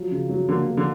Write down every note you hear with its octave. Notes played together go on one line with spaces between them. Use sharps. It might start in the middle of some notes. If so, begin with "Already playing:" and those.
Already playing: F3 F#3
C#3
F#3
D3 A#3
A#3
D3